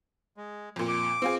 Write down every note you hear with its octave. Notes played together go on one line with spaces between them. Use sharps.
G#3
F2 A#2
D6
C4 F4 G#4